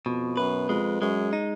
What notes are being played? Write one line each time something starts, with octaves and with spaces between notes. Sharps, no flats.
F2 B2
F#2 B4
F2 G#3
F#2 G#3
D#4